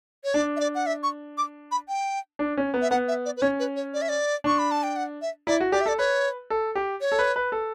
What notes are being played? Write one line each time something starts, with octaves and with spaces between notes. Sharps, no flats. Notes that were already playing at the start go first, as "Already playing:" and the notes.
C#5
D4 D5
E5
D5
F#5
E5
C#6
D6
B5
G5
D4
C#4
B3
E5
B3 F#5
E5
D5
B4
C#4 C#5
B4
C#5
D5
E5
D5
D4 C#6
B5
A5
G5
F#5
E5
E4 D5
F#4
G4 D5
E5
A4 D5
B4 C#5
A4
G4
C#5
A4
B4
B4
A4